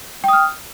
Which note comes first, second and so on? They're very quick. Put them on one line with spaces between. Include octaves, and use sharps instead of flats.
G5 D#6 F6